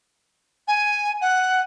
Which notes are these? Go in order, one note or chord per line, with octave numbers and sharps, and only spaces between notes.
G#5
F#5